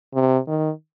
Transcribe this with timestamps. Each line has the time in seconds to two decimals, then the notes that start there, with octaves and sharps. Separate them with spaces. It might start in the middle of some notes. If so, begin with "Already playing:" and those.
0.15 C3
0.47 D#3